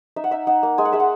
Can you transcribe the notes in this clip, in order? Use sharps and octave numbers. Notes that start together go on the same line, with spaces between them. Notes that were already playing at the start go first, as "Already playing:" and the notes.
D#4 E5
F#5
D#4 E5
D#4 F#5
A#3
G#3 G#5
F#5
G#3 E5
F#5